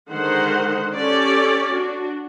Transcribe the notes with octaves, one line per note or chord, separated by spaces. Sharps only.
D3 D#3 G#3 C5 F#5
C#4 G4 A4 C#5 D5
D4 F#4